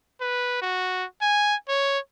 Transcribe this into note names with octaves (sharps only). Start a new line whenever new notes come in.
B4
F#4
G#5
C#5